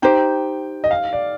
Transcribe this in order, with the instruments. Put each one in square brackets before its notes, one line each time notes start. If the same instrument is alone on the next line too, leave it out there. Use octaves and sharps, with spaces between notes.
[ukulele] D#4 G4 C5 [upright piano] G5
[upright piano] D#5
F5
D5